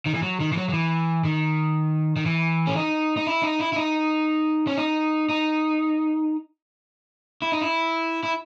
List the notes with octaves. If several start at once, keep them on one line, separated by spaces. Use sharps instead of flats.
D#3
E3
F#3
D#3
E3
F#3
F#3
E3
D#3
D#3
E3
C#4
D#4
D#4
E4
D#4
E4
E4
D#4
C#4
D#4
D#4
E4
D#4
E4
E4